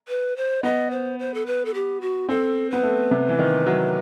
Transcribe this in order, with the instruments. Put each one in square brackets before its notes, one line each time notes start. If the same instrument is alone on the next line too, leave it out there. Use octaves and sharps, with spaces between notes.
[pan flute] B4
C5
[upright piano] B3 [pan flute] D#5
[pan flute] C5
C5
A4
B4
A4
G4
F#4
[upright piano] C4 [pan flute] A4
[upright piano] B3 [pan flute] B4
[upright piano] A3
C3
E3
D#3
F#3